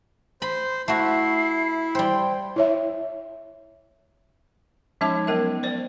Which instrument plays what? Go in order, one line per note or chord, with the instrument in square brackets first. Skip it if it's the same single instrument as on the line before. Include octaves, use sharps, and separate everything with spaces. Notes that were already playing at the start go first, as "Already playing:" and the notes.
[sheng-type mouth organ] C5 [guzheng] B5
[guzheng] A3 F#4 [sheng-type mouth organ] E4 [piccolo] C7
[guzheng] G3 C5 [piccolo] G5
[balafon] E4 C#5 E5
F3 G#3 C#4 D#4 E5 A5
F#3 B3 A#4 E5
C5 D5 G5